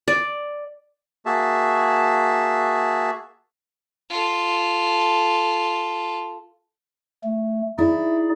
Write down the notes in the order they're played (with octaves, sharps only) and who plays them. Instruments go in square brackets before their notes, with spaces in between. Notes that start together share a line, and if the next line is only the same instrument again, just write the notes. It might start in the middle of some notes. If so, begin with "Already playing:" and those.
[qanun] D5
[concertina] A#3 F#4 G#4 E5 A5
[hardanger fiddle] F4 A4
[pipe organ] A3
[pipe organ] D#4 G#4 D5 [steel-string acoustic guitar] E4